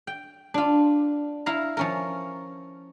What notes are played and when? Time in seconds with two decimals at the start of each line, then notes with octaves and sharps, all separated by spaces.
0.07 G5
0.54 D4 F4
1.46 E4 F5 A#5
1.77 F3 C#4 A#4